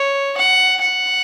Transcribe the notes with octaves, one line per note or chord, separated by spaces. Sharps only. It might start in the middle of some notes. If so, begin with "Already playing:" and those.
Already playing: C#5
F#5
F#5